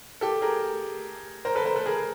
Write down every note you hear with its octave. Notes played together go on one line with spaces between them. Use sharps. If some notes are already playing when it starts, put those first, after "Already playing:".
G4 A4
G#4 A#4
A#4 C5
A4 B4
A#4 C5
A4 B4
G#4 A#4